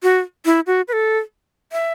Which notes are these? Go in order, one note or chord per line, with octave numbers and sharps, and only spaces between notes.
F#4
E4
F#4
B4
A4
E5